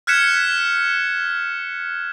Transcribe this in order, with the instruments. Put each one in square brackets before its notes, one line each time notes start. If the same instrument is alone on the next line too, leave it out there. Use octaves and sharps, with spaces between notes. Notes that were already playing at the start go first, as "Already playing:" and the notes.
[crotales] F6 F#6 G#6 B6 C#7 E7